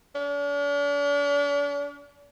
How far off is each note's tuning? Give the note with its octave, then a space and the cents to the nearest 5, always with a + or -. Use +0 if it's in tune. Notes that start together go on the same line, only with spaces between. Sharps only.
D4 -45